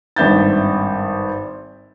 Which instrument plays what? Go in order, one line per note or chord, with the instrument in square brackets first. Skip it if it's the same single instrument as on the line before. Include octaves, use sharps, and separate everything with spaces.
[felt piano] G#1 G2 E5 G6 A6